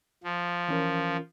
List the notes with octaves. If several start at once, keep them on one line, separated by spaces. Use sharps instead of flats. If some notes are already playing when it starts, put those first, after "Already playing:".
F3
E3 C#4 A#4